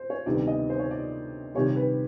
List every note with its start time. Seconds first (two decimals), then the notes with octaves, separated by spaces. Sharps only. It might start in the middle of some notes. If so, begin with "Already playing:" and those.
Already playing: C5
0.10 C#5
0.26 D2 C3 D#3 G3 B3 D5
0.47 D#5
0.70 C5
0.79 C#5
0.91 D5
1.54 C3 D#3 G3 C#5
1.76 B4